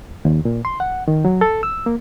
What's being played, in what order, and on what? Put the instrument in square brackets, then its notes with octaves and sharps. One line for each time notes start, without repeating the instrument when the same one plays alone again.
[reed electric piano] D#2
A#2
C6
F#5
D#3
F#3
A4
E6
A#3